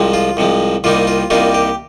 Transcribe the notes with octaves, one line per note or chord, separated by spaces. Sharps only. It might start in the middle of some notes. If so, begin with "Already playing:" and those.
Already playing: C2 C3 F3 G#3
F4
C2 C3 F3 G#3
C2 C3 G3 A#3 D#4 F4
F4
C2 C3 G3 A#3 D#4 F4
G4